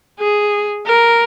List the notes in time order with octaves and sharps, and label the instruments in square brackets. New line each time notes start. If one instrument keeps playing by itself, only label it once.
[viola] G#4
A#4